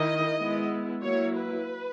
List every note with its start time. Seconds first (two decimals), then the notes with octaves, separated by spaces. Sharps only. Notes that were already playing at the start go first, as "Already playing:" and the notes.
Already playing: D#3 E4 D#5
0.39 G#3 B3 E4
1.02 F#3 A#3 E4 C#5
1.35 B4